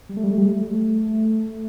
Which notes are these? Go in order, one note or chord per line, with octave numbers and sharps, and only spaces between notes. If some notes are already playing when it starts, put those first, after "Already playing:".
G3
A3
G3
A3
G3
A3